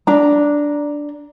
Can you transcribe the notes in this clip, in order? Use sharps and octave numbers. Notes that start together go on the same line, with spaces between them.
D4 A#5